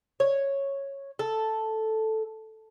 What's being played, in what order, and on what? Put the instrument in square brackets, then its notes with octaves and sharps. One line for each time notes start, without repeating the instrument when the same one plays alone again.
[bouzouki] C#5
A4